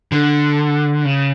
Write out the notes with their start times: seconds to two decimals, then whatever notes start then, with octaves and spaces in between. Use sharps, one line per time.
0.12 D3
1.05 C#3